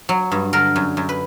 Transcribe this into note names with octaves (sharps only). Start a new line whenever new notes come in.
F#3
G2
D3 A#4
F#2
F#2
B4